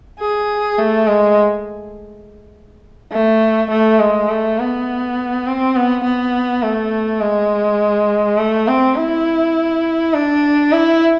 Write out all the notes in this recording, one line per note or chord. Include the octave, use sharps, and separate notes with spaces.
G#4
A3
G#3
A3
A3
G#3
A3
B3
C4
B3
B3
A3
G#3
A3
C4
E4
D4
E4